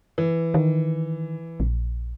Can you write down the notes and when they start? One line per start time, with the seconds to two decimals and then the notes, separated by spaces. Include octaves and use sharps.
0.18 E3
0.54 D#3
1.60 A#1